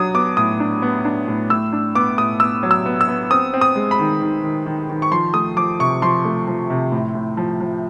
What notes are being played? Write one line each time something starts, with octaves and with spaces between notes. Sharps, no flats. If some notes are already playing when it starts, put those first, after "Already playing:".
Already playing: F#3 D4 D#6
B3 D6
A2 D#6
D4
B3
D4
A2
A2 E6
D4
B3 D6
A2 D#6
B3 E6
F#3
E6
B3
E6
B3
C4 D#6
C4
D#6
G#3
B5
D#3
D#3
D#3
D#3
D#3
C#6
F3 C6
A3 D#6
F3 D6
C3 C#6
F3 C6
A3
F3
C3
A2
A2
F3
F3